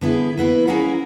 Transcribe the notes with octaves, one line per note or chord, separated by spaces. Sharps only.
D3 B3 E4 G#4
A#3 B3 E4 B4
C#4 E4 G#4 A#4 F5 F#5